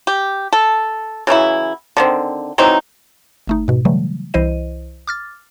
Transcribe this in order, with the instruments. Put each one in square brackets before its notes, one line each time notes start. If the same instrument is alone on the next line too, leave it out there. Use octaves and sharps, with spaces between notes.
[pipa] G4
A4
C#3 E3 F#3 E4
D3 D#3 C4
E3 F#3 C4 D#4
[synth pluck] G1 A3 D#4
G#2 B2
C#3 E3 F#3 G3 A3
C2 E3 E4 C5 D#5 D#7
D6 F6 A6